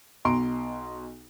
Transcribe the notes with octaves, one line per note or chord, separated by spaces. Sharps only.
B1 B2 A#5 C6 D7